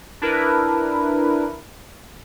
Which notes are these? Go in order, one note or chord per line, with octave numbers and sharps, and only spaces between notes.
D4 E4 A#4 B4